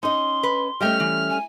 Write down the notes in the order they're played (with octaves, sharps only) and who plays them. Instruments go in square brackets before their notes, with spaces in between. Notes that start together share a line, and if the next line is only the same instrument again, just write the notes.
[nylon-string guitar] C#4 D#5 [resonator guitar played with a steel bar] D#4 [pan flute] C6
[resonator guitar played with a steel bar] B4
[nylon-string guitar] G3 A3 C#4 [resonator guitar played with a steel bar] G4 D#5 G5 [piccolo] F6
[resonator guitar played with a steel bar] E3
[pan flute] G#5